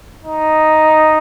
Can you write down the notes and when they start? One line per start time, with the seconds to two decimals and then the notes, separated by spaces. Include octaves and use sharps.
0.25 D#4